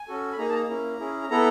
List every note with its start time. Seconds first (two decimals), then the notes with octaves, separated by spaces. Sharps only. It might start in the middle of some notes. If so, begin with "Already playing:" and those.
Already playing: G#5
0.08 C#4 F#4 A4
0.32 B5
0.38 A#3 D#4 G#4 A#5
0.49 A5
0.54 A#5
0.69 A#3 C#4 E4
0.99 C#4 E4 G#4
1.30 B3 E4 A4 A#5